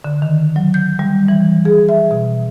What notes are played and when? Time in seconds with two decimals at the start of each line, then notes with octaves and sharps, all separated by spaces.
0.04 D3
0.22 D#3
0.56 F#3
0.74 G6
0.99 G3
1.28 E3
1.65 G#4
1.89 E5
2.11 B2